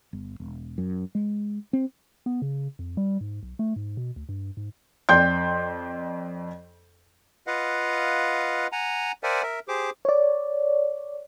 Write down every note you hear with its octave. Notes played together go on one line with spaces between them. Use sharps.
G1
E1
F#2
G#3
C4
B3
C#3
F2
G3
G#2
B1
A3
G#2
B2
D2
G2
G#2
F2 D5 G5 C6 G6
F4 B4 D#5 F5 F#5
F#5 G#5 A#5
A#4 C5 D5 E5 F#5 G#5
A#4 E5
G4 G#4 C5 D6
C#5 D5